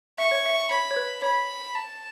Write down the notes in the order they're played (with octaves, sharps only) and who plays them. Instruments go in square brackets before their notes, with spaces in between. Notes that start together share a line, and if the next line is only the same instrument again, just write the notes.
[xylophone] E5 [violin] C#6
[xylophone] C#5
E5
[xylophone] C#5 [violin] B5
[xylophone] C#5
B4
[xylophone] C#5 [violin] B5
[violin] A5